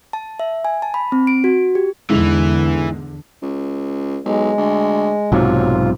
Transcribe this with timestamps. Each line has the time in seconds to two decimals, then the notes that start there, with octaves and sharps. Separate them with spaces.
0.13 A5
0.40 E5
0.65 G#5
0.82 A5
0.94 B5
1.12 C4
1.27 D7
1.44 F#4
1.75 G4
2.10 E2 G#2 D3 E3 G#3 F7
3.42 C#2
4.25 B1 G#3
4.58 D2
5.32 B1 G#2 C3 F#3 F4